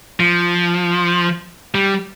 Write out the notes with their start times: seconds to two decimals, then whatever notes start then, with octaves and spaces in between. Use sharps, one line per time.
0.20 F3
1.75 G3